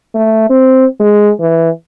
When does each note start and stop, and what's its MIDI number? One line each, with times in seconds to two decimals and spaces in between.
0.15 0.46 57
0.50 0.86 60
1.00 1.30 56
1.40 1.69 52